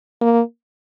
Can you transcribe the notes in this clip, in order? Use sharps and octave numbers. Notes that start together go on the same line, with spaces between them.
A#3